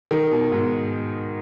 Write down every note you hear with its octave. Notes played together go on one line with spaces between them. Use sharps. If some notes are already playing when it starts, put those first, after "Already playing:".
D#3
B2
G#2